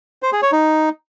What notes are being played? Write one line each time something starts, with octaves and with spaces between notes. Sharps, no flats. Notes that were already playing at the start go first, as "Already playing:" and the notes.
C5
G#4
C#5
D#4